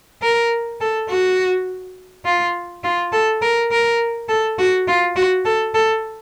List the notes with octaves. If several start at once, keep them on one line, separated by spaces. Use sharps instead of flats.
A#4
A4
F#4
F4
F4
A4
A#4
A#4
A4
F#4
F4
F#4
A4
A4